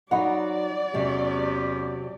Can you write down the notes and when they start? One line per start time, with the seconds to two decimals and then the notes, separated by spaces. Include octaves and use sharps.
0.11 F#3 D#4 D5 F#5 B5
0.94 E2 C3 F#3 G#3 C#4 G4